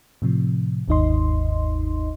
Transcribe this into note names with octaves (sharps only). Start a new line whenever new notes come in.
A2 C3 F3
G1 D#2 G#2 D#4 D#5 C6